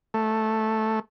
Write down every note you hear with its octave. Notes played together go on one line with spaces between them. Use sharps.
A3